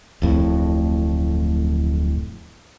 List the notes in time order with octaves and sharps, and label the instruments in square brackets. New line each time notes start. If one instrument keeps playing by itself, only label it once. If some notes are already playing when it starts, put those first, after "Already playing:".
[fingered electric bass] D1 F2 A2